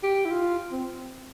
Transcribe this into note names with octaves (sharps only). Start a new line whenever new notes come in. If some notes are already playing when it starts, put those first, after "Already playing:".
G4
E4
F4
C4